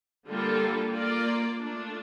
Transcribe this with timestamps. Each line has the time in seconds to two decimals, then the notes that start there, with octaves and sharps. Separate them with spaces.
0.29 D3 G3 A#3 F4 A4
0.94 A#3 F4 A#4 D5
1.59 A3 D4 F4